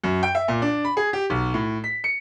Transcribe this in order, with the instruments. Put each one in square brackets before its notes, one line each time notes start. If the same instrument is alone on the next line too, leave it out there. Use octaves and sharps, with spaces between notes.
[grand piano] F#2
G5
E5
A#2
D4
B5
G#4
G4
B1
A2
B6
C#7